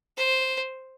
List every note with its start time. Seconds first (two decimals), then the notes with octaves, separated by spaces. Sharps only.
0.17 C5